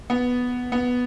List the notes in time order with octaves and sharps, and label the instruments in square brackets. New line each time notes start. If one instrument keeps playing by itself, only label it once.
[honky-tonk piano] B3
B3